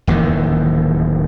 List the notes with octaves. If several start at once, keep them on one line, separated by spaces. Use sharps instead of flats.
D1 D#2 D#3 E3